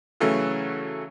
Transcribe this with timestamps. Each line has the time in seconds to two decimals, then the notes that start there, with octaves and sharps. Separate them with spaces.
0.20 C#3 E3 F#3 A3 C#4